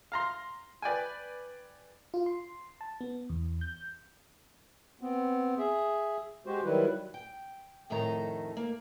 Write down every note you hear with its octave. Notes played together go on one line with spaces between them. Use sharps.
F5 A#5 C6
B4 D5 G5 G#5
F4
C6
A5
B3
E2
G6
B3 C4
G#4 E5
G#3 F#4 G4 C5
D#3 F#3 G3 E4 B4
G5
F2 A2 D#3 D#4 A4 A#5
A#3